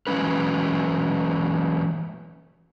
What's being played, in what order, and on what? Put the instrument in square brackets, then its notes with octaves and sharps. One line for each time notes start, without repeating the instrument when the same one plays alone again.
[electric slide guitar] E3 F#3 G#3 C#4 B4